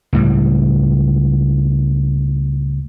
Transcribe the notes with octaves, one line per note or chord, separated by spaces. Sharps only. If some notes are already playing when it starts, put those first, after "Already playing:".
C#2 A2 G3